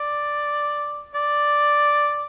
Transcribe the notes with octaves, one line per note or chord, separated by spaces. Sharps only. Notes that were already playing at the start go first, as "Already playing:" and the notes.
Already playing: D5
D5